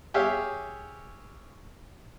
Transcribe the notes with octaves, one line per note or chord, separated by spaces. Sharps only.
G4 G#4 C#5 E5 F5